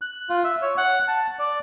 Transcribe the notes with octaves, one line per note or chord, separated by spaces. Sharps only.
F#6
F4
E5
C#5
F#5
A5
D5